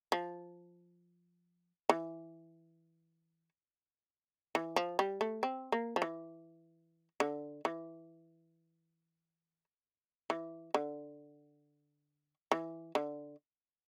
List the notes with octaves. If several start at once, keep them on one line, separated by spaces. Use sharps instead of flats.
F3
E3
E3
F3
G3
A3
C4
A#3
F3
E3
D3
E3
E3
D3
E3
D3